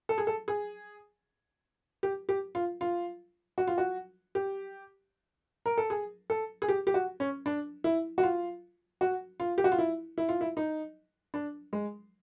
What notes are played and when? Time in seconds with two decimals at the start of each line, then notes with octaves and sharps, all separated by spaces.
0.09 A4
0.18 G#4
0.27 A4
0.48 G#4
2.03 G4
2.29 G4
2.55 F4
2.81 F4
3.58 F#4
3.67 F4
3.78 F#4
4.35 G4
5.66 A#4
5.78 A4
5.90 G#4
6.30 A4
6.62 G#4
6.68 G4
6.87 G4
6.94 F#4
7.20 C#4
7.46 D4
7.84 E4
8.18 F#4
8.23 F4
9.01 F#4
9.40 F4
9.58 G4
9.64 F#4
9.72 F4
9.79 E4
10.18 E4
10.29 F4
10.41 E4
10.57 D#4
11.34 D4
11.73 G#3